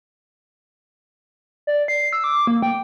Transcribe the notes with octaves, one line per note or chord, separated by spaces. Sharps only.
D5
C7
E6
D6
A#3
G5